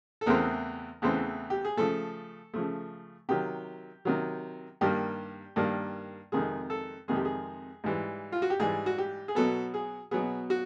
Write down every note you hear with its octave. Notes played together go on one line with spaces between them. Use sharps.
A4
E2 C#3 E3 A3 C4 A#4
E2 C#3 E3 A3 C4
G4
G#4
C#3 F3 A3 A4
C#3 F3 A3
C3 D#3 F#3 G4
C3 D#3 F#3
G2 D#3 G3 A#3 G4
G2 D#3 G3 A#3
F2 C3 D#3 G#3 G#4
A4
F2 C3 D#3 G#3 G#4
G4
G#4
G#2 E3 G3
F4
F#4
G4
G#2 E3 G3 G#4
F#4
G4
G#4
B2 F#3 B3 A4
G#4
B2 F#3 B3 G#4
F#4